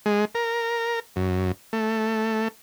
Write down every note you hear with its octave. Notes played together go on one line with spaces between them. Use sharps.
G#3
A#4
F#2
A3